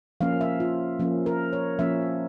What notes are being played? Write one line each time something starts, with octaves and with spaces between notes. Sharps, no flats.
F3 A#3 C#4 F5
E5
F4
F3 A#3 C#4
A#4
C#5
F3 A#3 C#4 E5